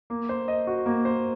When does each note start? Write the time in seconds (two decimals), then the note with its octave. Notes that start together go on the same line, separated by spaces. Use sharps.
0.10 A#3
0.29 C5
0.48 D#5
0.67 F#4
0.86 A#3
1.05 C5